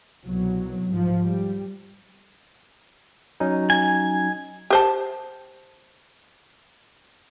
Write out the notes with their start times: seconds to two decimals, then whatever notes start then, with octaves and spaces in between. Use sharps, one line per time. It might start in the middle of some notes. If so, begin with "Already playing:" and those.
0.25 C2 B2 F#3
0.90 G#2 F3
1.22 G3
3.40 F#3 C#4 D#4
3.70 G#5
4.70 G4 C5 A5